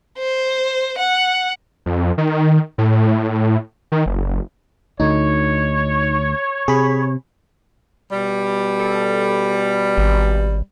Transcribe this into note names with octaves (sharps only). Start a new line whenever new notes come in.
C5
F#5
F2
D#3
A2
D#3
F#1
D2 D3 D#4 C#5
C3 G#4 B5
B2 G3
A4
G#1